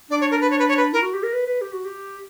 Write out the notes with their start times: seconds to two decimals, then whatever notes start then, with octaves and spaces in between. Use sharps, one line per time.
0.11 D4 D5
0.21 C#5
0.31 A#4
0.41 B4
0.51 C#5
0.59 B4
0.69 C#5
0.77 B4
0.93 E4 A#4
1.03 F#4
1.14 G4
1.23 A#4
1.33 B4
1.47 B4
1.62 G4
1.73 F#4
1.85 G4